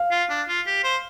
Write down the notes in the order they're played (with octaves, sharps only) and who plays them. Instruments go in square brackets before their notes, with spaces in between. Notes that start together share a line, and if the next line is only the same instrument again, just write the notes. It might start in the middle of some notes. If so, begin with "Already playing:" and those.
Already playing: [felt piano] F5
[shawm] F4
D4
F4
G4
C5